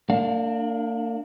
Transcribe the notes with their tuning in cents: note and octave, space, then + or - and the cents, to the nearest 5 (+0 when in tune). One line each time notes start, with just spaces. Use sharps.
A#3 -40 D4 +0 F5 +25